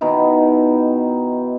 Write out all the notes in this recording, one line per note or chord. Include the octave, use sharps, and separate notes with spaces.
B2 D#3 D#4 E4